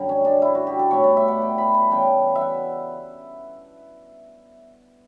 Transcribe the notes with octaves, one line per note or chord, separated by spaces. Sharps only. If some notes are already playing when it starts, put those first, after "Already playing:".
Already playing: F#2 D3 G3
C#4
D4
E4
F#4
G4
A4
A2 G3 B3 C#5
D5
E5
F#5
G5
B5
A5
C#3 E3 G3 B3 G5
E5
F#5